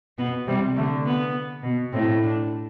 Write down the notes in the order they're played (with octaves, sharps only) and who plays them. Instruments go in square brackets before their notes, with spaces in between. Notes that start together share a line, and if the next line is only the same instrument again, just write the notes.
[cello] B2 [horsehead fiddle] B3
[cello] C3 [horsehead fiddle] G3
[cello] D3 [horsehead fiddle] A3
[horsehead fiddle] B3
[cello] B2
[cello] A2 [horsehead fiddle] C4
[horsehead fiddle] D4